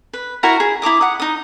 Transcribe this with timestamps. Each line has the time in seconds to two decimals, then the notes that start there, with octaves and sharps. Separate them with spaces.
0.13 B4
0.43 E4 F#4 A#4 A#5
0.60 G#4
0.82 E4 A#5 D6 D#6
1.01 F#5 D#6
1.20 D#4 D#6